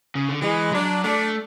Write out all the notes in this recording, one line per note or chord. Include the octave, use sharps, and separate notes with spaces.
C#3
D3
E3 G#3
F#3 D4
A3 D4